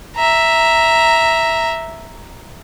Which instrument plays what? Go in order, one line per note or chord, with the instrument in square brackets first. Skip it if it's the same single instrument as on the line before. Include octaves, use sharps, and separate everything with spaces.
[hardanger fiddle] E5 A#5